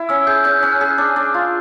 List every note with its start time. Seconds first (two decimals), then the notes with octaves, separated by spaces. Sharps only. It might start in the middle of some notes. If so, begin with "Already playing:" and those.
Already playing: E4
0.09 C#4 E6
0.27 G#4 G6
0.44 C#4 G6
0.58 C#4 F#6
0.72 F6
0.81 G#4 F#6
0.98 D4
1.16 D4
1.34 F4